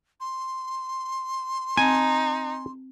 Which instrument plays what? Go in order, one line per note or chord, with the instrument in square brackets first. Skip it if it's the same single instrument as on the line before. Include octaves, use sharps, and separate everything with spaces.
[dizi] C6
[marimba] C4 A5 [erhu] D#4 [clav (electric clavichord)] G#5